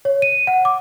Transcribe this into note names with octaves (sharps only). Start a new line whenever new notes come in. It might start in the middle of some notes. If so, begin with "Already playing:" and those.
C#5
D#7
F#5
D6